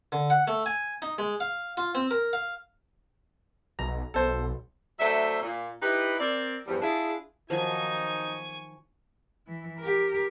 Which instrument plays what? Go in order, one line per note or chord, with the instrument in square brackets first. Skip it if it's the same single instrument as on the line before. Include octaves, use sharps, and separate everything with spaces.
[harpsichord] D3
F#5
A3
G#5
D#4
G#3
F5
F4
C4
A#4
F5
[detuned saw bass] B1 [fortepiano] A#5
[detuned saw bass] B1 [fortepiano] A4 C5
[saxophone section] F#3 A3 D4 C5 E5
A#2
D#4 E4 G4 B4
C4 A#4 D5
E2 G2 F3 G3
D4 E4 F4 G#4
[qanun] D#3 F3 F#3 [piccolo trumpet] D#4 [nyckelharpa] G#5 C#6
[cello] E3
G4 A#4